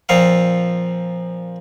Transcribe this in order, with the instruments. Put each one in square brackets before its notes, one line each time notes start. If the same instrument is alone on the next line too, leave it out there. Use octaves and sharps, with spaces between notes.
[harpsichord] A#2 F3 C4 F5